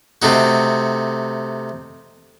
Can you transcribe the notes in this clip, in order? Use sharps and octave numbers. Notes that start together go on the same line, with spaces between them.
C3 A3 D#4 F#4